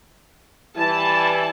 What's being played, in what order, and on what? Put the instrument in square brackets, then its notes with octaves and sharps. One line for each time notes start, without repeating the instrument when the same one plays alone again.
[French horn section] E3 G3 E4 [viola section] A5